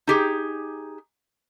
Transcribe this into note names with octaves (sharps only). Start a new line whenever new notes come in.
D#4 G4 G#4